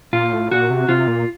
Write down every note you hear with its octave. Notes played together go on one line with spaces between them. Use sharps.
A#2 F4
A2
A#2 F#4
C3
C3 F4
A#2